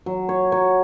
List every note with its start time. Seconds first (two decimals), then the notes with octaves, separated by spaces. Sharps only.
0.06 F#3
0.29 C#5
0.52 F#3 C#5